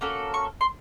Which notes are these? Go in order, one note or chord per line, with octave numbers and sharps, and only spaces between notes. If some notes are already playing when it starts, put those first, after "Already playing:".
A#3 C#4 F#4 A4
C#6
C6